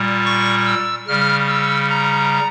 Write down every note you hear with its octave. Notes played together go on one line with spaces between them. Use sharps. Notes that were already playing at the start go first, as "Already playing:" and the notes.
Already playing: A#2 G3
C#6
E6
C#3 G3 F6
E6
A#5